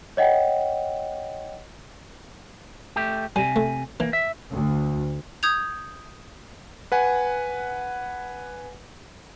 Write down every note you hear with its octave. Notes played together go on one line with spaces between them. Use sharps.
C#5 D#5 F#5 G5
A3 G4
C3 G3 G#5
A3
E3 A#3
E5
D2
D#6 G6 G#6 F7
B4 F#5 G#5